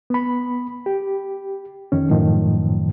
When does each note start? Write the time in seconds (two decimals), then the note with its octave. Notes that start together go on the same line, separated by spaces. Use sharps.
0.10 B3 B5
0.86 G4
1.92 F2 D#3 C#4
2.10 F#2 A2 D#3 F3